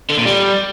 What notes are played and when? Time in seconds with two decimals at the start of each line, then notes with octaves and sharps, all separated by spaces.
0.10 D3
0.18 A#2
0.25 G3